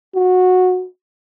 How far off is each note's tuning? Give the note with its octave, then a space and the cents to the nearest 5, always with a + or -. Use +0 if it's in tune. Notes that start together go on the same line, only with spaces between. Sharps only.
F#4 -15